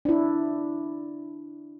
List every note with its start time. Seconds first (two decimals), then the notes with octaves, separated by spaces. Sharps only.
0.05 D4 E4